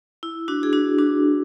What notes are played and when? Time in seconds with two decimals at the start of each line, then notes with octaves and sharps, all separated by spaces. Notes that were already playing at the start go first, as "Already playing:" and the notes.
0.23 E4
0.48 D4 F#4
0.63 G#4
0.73 D4 F#4
0.99 D4 F#4